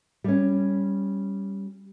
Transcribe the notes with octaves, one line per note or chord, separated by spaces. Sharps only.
G3 C#4